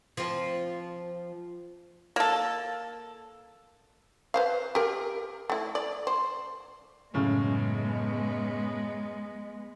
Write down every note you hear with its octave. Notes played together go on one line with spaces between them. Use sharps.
F3 C4
A#3 A4
B4 C5 F5
G4 A#4
A3 E4
D5
C5
F#2 A2 C#3 G#3 B3